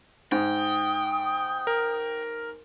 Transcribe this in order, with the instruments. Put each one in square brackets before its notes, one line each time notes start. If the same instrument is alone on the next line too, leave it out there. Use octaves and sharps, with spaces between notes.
[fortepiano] G#2 [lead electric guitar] G5 [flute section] D#6
[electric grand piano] A#4